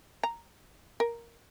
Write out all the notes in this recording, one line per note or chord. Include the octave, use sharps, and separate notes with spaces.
A#5
A#4